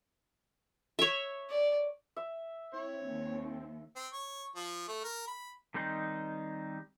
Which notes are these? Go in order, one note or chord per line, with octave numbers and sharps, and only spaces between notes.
C#5 E5
D5
E5
C4 E4 C#5
D#2
C4
C#5
F3
A3
A#4
B5
D#3 G3 C4 D#4 C5